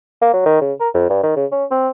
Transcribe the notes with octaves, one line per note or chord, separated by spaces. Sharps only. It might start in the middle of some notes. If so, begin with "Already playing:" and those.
A#3
F#3
D#3
C#3
A#4
F2
G2
D#3
C#3
C#4
C4